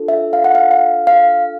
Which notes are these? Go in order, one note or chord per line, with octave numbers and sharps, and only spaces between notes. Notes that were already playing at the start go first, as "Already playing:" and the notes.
Already playing: D4 F4 A4
E5
F5
F#5
F5
F5
F5